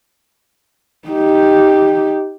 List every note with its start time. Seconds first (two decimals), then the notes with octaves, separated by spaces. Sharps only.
1.08 D#4 G4